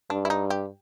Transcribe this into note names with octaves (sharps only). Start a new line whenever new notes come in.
G2 D4
E4
D#4
G4